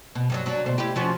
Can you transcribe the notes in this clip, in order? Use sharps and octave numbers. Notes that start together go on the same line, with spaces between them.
B2
G2 F3 F#3
F#3 D4
D2 B2 C5
E4 G4
F3 C#4 F#4